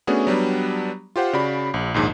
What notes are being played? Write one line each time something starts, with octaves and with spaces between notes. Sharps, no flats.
A3 B3 C#4 D4 F#4 G#4
F#3 G3 B3 D4
F4 G4 C5 F#5
C#3 F#4 D5 B5
A#1
A#1 D#2 G#2